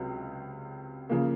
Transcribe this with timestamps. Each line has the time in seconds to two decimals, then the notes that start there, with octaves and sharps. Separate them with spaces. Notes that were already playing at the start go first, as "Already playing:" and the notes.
Already playing: C#2 C3 F#3
1.10 C#3 F3 A#3